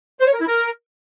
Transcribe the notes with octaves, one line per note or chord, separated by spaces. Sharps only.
C5
C#5
A#4
E4
A#4